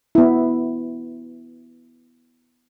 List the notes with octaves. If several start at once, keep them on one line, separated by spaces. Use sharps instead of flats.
B3 E4